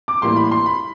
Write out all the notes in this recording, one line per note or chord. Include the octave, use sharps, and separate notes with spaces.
D6
A2 E3 G3 A#3 C6
B5
C6
B5